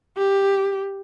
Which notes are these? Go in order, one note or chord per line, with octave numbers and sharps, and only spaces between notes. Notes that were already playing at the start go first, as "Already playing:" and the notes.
G4